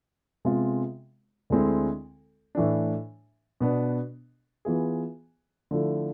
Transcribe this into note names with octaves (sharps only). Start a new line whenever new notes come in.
C3 G#3 B3 F4
D2 D3 G#3 C4 E4
A2 E3 A3 D4
B2 B3 D4
E3 B3 F4 G#4
D3 F3 A3 E4